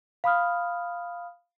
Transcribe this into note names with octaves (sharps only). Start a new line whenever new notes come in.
F5 B5 D#6 F6